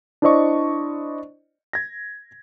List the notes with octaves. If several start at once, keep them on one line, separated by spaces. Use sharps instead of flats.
D4 E4 C5 D5 D#5 C#6
G#6 A#6